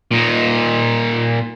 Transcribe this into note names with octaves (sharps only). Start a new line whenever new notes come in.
A#2 D#4